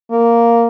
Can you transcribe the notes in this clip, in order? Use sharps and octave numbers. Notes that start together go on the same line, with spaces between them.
A#3